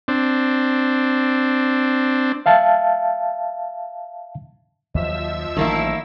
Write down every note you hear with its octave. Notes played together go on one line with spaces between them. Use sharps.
C4 D4
E5 F5 A5
D#2 F3 F#3 D#5 E5 E6
A1 D#3 E3 F#3 A#3 E4 A5